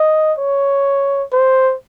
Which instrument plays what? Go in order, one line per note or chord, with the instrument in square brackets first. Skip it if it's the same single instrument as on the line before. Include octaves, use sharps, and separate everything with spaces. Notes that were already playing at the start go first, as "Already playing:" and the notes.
Already playing: [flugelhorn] D#5
C#5
C5